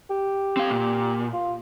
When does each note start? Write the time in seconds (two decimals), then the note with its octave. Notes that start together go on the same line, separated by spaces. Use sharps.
0.10 G4
0.57 C4 F5
0.70 A#2
1.33 F4